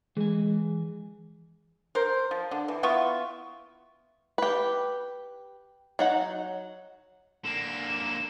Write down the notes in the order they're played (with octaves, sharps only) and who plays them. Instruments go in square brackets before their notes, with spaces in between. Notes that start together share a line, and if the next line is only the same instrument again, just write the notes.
[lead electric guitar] E3 G#5 [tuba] G#3
[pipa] A#4 C5
F3
D3
E3
B3 E4 F4 C#6
[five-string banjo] G4 B4
F#3 D#4 F#5
[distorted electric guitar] D3 A#3 [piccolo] E7
[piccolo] E7